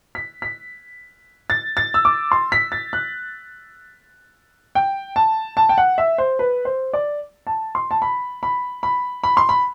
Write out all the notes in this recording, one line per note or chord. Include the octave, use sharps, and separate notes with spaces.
B6
B6
A6
A6
E6
D6
C6
B6
A6
F#6
G5
A5
A5
G5
F#5
E5
C5
B4
C5
D5
A5
C6
A5
B5
B5
B5
B5
C6
B5